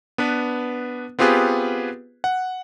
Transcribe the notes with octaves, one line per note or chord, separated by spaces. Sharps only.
B3 D4 B4
B3 C4 F4 G4 G#4 B4
F#5